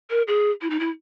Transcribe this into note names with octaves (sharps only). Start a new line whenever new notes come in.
A#4
G#4
E4
D#4
E4